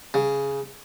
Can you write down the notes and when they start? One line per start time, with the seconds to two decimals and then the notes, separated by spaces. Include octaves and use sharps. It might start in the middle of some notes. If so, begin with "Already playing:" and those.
0.14 C#3